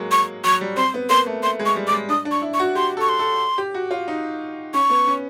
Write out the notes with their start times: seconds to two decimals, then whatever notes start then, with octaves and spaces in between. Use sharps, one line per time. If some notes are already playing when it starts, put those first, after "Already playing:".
Already playing: F#3 G#3 A#3
0.11 C#6
0.44 F#3 C#6
0.61 G3
0.77 C4 C6
0.94 B3
1.09 A#3 C6
1.26 A3
1.43 A3 C6
1.59 G#3
1.66 C#6
1.76 G3
1.87 D6
1.92 G#3
2.09 D4 D#6
2.25 D4
2.31 C#6
2.42 E4
2.54 C#6
2.59 F#4
2.75 G4 C6
2.97 A4
3.01 C#6
3.09 C6
3.19 A4
3.58 G4
3.74 F#4
3.91 F4
4.08 D#4
4.74 C#4 C#6
4.90 B3
5.07 C#4